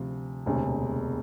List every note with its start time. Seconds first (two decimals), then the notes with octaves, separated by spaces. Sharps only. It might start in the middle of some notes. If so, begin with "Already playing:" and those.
Already playing: D2 C3 F3
0.46 E1 D2 C3